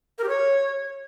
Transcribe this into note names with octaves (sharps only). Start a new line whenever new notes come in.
A#4
G4
C#5